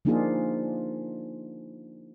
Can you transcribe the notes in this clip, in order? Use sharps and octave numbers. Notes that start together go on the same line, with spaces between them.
F3 A#3 D4 D#4 F4 G#4